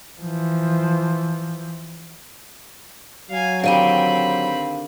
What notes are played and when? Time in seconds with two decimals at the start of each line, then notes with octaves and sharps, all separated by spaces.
0.20 E3 F3
3.31 F#3 F5 G#5
3.64 D3 D#3 C4 G4 F5 B5 D#7